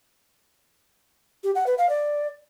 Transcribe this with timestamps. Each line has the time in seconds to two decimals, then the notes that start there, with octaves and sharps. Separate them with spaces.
1.44 G4
1.55 F#5
1.66 B4
1.78 F5
1.89 D5